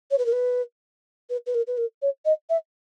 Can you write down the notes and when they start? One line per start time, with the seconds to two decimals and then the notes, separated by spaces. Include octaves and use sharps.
0.11 C#5
0.18 B4
0.26 A#4
0.32 B4
1.30 B4
1.46 B4
1.55 A#4
1.67 B4
1.78 A#4
2.02 C#5
2.25 D#5
2.50 E5